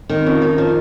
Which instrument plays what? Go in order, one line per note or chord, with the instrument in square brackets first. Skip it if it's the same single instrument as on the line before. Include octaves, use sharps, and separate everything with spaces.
[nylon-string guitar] D#3
[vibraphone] C4
[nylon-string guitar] F2 [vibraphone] C#4
[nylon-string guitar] D#3
[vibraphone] F4
[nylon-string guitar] F3